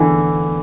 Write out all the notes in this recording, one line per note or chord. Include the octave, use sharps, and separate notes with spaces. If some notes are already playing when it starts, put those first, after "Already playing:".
Already playing: D3 E3